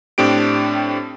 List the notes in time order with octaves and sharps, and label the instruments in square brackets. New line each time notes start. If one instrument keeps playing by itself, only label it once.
[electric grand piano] A2 C4 D4 G4 D7